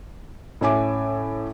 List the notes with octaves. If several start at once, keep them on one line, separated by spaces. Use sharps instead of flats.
A2 C#4 E5 G#5 D6